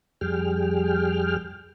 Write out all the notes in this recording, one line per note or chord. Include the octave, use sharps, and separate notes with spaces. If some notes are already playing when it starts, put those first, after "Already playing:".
F2 G3 G#4 G5 F6